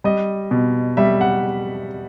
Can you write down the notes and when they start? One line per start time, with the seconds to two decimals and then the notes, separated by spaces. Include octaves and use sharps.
0.04 G3 D#5
0.51 B2
0.97 G3 E5
1.21 F#5